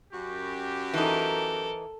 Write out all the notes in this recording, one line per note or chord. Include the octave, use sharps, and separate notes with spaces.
F#2 F#4 G4
E3 D#4 A4 A#4